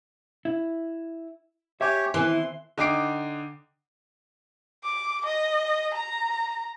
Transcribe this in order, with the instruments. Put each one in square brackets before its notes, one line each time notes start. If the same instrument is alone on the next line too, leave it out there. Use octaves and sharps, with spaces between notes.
[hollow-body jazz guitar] E4
[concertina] G4 C#5 [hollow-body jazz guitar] E5 G#5
[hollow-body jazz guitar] D#3 B3 C4 [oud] E3 [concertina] C6
[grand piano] D3 D#4 G5 D6 C7 D7
[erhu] D6
D#5
A#5